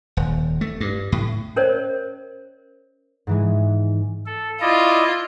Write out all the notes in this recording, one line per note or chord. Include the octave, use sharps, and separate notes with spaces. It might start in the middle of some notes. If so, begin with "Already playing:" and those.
D#1
A3
G2
A2
C#4 A#4 C5 C#5 D#5
G#2 E3 G#3
A4
E4 F4 D5 D#5